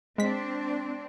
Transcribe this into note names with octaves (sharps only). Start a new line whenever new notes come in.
G#3 C4 D4 B6